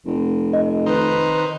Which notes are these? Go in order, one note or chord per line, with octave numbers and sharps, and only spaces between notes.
F1
D#5
D#3 D#4 B4 C5